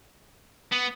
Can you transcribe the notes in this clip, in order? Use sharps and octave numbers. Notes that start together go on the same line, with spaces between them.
B3